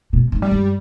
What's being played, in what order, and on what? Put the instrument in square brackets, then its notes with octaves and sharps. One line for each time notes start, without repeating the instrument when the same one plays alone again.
[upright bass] B2
G#2
[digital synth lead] G3
[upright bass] G2